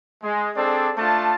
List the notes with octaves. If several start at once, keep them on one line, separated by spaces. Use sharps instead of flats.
G#3
C4 D4 G#4 A4 D5
A3 D4 F4 A5